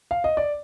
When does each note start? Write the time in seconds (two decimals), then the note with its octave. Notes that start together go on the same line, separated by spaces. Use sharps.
0.11 F5
0.24 D#5
0.37 D5